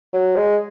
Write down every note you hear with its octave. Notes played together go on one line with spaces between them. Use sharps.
F#3
G#3